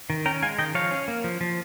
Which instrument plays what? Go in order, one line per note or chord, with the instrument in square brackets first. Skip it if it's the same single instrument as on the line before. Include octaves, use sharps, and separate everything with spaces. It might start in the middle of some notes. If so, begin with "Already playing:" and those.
[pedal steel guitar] D#3
C#4 G5 A#5
G#3 F5 G#5
D#3 D#5 G5
F3 C#5 F5
C#4
A#3
F3
F3